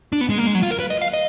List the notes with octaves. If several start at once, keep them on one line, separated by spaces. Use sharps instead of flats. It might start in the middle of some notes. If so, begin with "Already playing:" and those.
D4
B3
G#3
A#3
G#3
F#3
F4
A#4
B4
D#5
F5
D#5